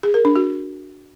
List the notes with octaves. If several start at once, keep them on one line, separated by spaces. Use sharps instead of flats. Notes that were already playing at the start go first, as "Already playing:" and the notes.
G#4
A#4
D4
F#4